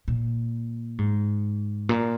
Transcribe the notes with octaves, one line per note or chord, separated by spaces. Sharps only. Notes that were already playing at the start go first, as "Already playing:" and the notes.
A#2
G#2
A#2